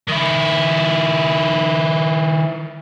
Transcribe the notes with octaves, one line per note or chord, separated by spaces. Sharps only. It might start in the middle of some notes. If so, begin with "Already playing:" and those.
D#3 E4